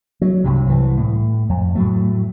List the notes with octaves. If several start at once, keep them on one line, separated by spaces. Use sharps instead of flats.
F#3
C2 G2 C3
C2 E3
A2
F2
A2 F#3 A3